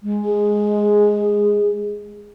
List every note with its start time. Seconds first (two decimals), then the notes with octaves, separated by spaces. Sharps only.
0.02 G#3
0.25 G#4